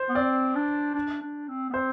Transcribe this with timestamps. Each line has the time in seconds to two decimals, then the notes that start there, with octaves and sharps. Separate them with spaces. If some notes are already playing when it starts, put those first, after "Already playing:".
Already playing: C5
0.09 B3
0.15 C4 D5
0.55 D4
0.95 D4
1.21 D4
1.48 C4
1.70 B3
1.74 C4 C5